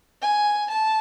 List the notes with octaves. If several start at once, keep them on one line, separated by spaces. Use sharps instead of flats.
G#5
A5